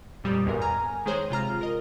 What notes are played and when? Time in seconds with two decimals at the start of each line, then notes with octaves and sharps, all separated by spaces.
0.24 F2 A#2 G3 G4 D#6
0.46 B1 E2 G#2 A#4
0.61 G#5 A#5 F6
1.05 D#3 G#3 G#4 C5 C#5
1.30 C3 F4 A#5 F6
1.61 A#4 D#5